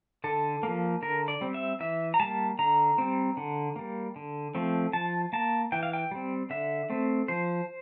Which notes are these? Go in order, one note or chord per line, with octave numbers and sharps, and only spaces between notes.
D3 A4
F3 A#3
D3 A#4
D5
G3 C4
E5
E3 E5
A#5
G3 A#3 A5
D3 A#5
G3 C4
D3
G3 A#3
D3
F3 A3 C4
F3 A5
A#3 A5
E3 G5
F5
G5
G3 C4
D3 E5
A3 C4
F3 C5